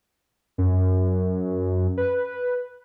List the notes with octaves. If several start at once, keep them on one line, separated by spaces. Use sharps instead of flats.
F#2
B4